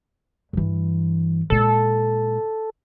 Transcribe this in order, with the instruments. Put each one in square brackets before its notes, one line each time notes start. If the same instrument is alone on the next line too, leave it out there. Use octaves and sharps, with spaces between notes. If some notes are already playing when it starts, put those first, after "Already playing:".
[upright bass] G2 E3
[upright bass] A#2 G#3 [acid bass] A4